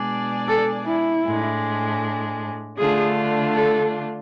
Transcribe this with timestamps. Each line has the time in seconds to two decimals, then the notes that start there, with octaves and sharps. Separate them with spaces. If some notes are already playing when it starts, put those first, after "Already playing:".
Already playing: B2 G#3 D4 G#4 D5
0.49 A4
0.87 E4
1.26 A2 G#3 D4
2.78 D3 A3 D4 F4 G#4
3.55 A4